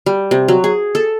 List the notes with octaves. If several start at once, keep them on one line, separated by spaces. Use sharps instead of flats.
G3
C3
F#3
G#4
A4